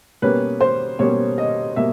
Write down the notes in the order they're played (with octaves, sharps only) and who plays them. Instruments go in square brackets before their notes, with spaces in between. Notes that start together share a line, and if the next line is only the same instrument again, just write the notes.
[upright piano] B2 G3 A#3 C#4 B4
C5
B2 G3 A#3 C#4 C#5
D#5
B2 G3 A#3 E5